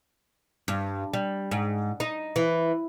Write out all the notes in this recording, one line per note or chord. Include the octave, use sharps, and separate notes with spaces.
G2
G3
G#2
D#4
E3